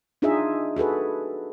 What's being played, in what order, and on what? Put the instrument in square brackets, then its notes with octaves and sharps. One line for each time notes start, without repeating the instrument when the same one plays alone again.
[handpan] D4 D#4 F4 G#4 D#5 E5
F#4 G#4 A4 B4